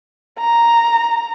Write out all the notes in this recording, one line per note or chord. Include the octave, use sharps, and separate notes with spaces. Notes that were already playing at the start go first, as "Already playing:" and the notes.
A#5